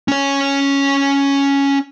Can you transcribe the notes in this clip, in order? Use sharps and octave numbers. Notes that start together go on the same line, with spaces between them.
C#4 C#5